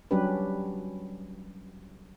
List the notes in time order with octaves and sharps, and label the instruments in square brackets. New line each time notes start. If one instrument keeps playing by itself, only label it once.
[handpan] F#3 G3 C#4 D4 G4 B4